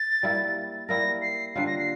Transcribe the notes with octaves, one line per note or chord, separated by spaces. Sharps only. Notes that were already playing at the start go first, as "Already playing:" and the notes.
Already playing: A6
G3 A#3 E4 A#4
G3 A#3 E4 A#4 A#6
C7
D3 G3 A#3 F4 C7
A#6
C7